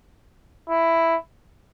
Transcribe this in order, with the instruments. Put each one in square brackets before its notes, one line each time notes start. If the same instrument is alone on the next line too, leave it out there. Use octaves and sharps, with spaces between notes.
[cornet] E4